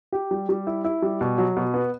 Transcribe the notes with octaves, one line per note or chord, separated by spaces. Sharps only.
G4
G3
G3
E4
E4
G3
B2
F#3
B2
B3